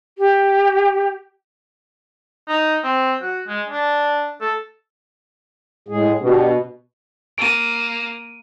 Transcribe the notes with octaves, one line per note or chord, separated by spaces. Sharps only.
G4
D#4
C4
F#4
G#3
D4
A4
A2 G#3 G#4
B2 D4 G4
A#3 D7 D#7